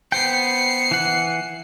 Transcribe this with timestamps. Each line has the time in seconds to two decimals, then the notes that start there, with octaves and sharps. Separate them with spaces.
0.12 B3 C5 G5 C7 C#7
0.91 E3 F#5